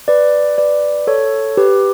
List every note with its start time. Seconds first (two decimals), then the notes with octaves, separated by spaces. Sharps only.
0.08 B4 D5
0.58 B4 D5
1.07 A4 C#5
1.57 G4 B4